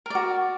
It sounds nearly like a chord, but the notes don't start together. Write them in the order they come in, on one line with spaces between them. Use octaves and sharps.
A#4 D5 F#4